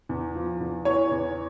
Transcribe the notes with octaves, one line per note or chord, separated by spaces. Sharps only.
E2
F3
E2
E3 C#5
E2